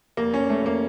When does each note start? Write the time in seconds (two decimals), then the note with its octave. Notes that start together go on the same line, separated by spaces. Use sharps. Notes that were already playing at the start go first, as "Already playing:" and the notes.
0.17 F1 A#3
0.34 C#4
0.39 F1
0.50 A3
0.61 F1 A#3